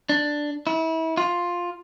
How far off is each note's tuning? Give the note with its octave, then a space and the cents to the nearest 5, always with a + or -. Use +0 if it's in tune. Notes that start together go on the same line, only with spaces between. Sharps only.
D4 +5
E4 -30
F4 +5